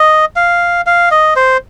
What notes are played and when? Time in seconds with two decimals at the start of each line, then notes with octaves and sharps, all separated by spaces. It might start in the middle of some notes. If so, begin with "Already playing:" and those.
Already playing: D#5
0.36 F5
0.86 F5
1.11 D#5
1.36 C5